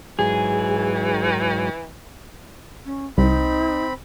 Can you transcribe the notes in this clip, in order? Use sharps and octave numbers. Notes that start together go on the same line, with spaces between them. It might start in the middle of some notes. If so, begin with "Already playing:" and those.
G#2 E3 F#3 G#4
C#4
C2 C4 D#4 B5